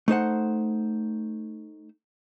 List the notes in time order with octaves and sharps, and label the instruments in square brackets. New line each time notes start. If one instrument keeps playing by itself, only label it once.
[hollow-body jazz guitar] A3 D#4 C5 F#5